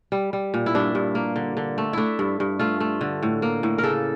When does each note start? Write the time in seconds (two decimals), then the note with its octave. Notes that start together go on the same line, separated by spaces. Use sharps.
0.12 G3
0.33 G3
0.54 A#2
0.66 E4
0.75 G2 D4
0.95 G2
1.15 A#3
1.36 D3
1.57 D3
1.78 A3
1.93 A3 D4 E4
2.19 G2
2.40 G2
2.59 A3 F4
2.80 A3
3.01 D3
3.23 A2
3.42 A#3
3.63 A2
3.78 A#4
3.84 C#3 A4